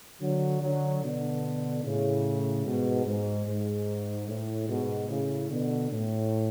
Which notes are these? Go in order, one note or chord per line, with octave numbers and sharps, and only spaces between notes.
D3 F#3
D3 F#3
B2 D3
A2 C#3
G#2 B2
G#2
G#2
A2
G#2 B2
A2 C#3
B2 D3
A2